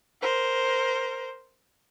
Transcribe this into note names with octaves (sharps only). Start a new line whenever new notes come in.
A#4 C5